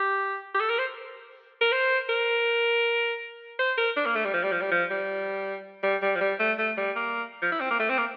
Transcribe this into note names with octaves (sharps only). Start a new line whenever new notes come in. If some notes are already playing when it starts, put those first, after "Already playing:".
Already playing: G4
G4
A4
A#4
C5
A#4
C5
A#4
C5
A#4
D4
A#3
A3
G3
F3
G3
F3
G3
F3
G3
G3
G3
F3
G3
A3
A3
G3
A#3
F3
E4
C4
A#3
A3
C4
A#3